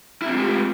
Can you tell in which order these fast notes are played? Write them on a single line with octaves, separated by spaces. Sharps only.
E4 C4 F4 G#3 G4